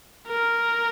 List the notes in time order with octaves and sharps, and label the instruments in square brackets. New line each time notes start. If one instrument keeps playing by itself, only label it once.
[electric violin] A#4